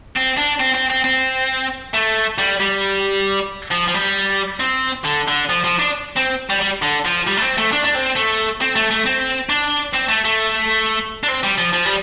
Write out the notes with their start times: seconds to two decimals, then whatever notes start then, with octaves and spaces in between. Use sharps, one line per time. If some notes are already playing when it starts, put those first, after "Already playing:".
0.16 C4
0.37 D4
0.60 C4
0.74 C4
0.90 C4
1.04 C4
1.94 A3
2.38 G3
2.60 G3
3.71 F3
3.88 F3
3.94 G3
4.60 C4
5.05 D3
5.28 D3
5.50 F3
5.64 F3
5.79 D4
6.16 C4
6.50 G3
6.61 G3
6.82 D3
7.05 F3
7.27 G3
7.37 A3
7.42 C4
7.58 A3
7.72 D4
7.84 D4
7.94 C4
8.16 A3
8.61 C4
8.76 A3
8.91 A3
9.06 C4
9.49 D4
9.94 C4
10.09 A3
10.25 A3
11.24 D4
11.28 C4
11.43 G3
11.58 F3
11.73 F3
11.86 G3